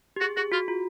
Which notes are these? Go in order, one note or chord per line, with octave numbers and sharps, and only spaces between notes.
G4
F#4 G#4
F#4 G#4
F4 F#4
F4